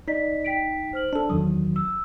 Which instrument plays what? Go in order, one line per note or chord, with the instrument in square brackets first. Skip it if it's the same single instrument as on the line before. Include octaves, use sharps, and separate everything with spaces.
[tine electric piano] D#4 [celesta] D5 D#5 B6
[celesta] G5 B6 D7
C5 F6 F#7
[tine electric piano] D4 A4
[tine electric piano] E2 D#3 F#3 [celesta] D#6
[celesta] E6